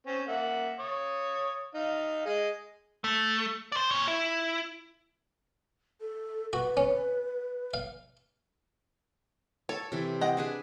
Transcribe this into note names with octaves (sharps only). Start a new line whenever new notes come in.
C4 C#4
A#3 E5 F#5
C#5 D#6
D#4 F5
G#4 D#5
A3
C5 D5
A#2 C#5
E4
A4
F#4 B4
C#4
F5
A4 C#5
C3 E3
D#5 F#5 G5
D4 G#4 B4